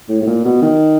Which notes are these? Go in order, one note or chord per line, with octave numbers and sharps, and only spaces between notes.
A2
A2
A#2
B2
D#3